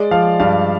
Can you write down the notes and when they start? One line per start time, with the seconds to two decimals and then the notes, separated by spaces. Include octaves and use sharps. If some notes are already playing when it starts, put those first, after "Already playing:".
Already playing: G#3 D5
0.11 F3 F5
0.40 G2 F5